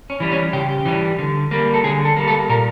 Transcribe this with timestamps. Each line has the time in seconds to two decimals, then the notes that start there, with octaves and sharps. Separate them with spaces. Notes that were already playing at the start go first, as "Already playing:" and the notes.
0.10 C#4
0.20 E3 G3
0.32 C#4
0.53 C#3 G4
0.85 E3 G3
1.19 D3
1.51 G3 A#3
1.74 A4
1.84 D3 G#4
2.05 A4
2.16 G3 A#3
2.28 A4
2.49 A#2 A#4